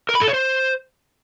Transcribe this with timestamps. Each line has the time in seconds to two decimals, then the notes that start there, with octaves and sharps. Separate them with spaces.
0.09 A#4
0.15 B5
0.21 A4
0.28 C#5
0.34 C5